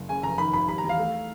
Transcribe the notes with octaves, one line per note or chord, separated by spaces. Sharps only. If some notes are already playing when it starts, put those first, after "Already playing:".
Already playing: F#1
C#3 G#5
F1 A#5
D#3 B5
G#1 B5
G3 B5
A#5
E2
F5
A3